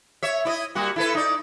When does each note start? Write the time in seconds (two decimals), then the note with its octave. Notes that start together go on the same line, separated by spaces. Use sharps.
0.23 C#5 E5
0.45 E4 D5 D#5
0.75 G3 A#3 F#4
0.96 E4 A4 B4
1.15 D#4 D5